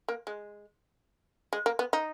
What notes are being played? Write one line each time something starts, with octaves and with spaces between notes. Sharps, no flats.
A#3
G#3
G#3
A#3
B3
D#4